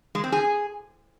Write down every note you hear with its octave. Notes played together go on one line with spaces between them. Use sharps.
G#3
C4
G#4